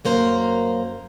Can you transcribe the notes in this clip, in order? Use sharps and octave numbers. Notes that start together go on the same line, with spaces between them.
F#2 A#3 C5 A#5